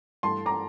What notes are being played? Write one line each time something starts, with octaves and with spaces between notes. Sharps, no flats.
G2 E3 A3 A5 C6
A#5 D6